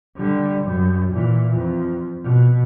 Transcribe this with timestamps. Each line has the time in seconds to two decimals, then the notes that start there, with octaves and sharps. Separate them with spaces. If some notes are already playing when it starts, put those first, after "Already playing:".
0.17 D3 G3
0.63 F#2
1.12 A#2 E3
1.54 F2
2.23 B2